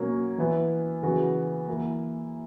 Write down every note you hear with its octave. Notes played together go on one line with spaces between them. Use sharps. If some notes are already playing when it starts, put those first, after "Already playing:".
Already playing: B2 F#3 A#3 C#4
E3 B3 E4
C#3 E3 B3 F#4
E3 A#3 E4